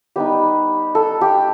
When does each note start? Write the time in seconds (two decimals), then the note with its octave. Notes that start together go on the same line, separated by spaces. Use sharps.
0.16 G3 B3 D#4 G4
0.95 A4
1.21 G4